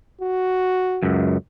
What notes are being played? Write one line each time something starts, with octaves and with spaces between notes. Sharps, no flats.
F#4
C#2 F#2